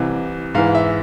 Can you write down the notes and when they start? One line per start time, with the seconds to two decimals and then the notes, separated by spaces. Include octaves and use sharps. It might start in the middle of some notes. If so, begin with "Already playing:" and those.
Already playing: C2 C3 E3
0.54 G#2 E3 F5
0.75 E5